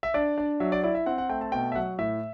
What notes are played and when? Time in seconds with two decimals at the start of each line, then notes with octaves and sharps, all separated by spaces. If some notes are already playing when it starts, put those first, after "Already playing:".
0.03 E5
0.14 D4 D5
0.38 D4
0.60 F#3 E5
0.72 D5
0.84 E4 D5
0.95 E5
1.06 C4 F#5
1.18 F#5
1.29 A3 G5
1.41 A5
1.52 B2 G5
1.72 E5
1.76 F#3 F#5
1.98 A2 E5